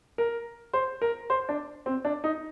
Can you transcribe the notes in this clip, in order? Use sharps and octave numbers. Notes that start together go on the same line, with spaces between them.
A#4
C5
A#4
C5
D4
C4
D4
D#4